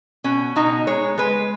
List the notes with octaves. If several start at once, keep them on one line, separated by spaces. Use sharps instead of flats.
B2 C#4
B2 D#4
G#3 C#5
G#3 B4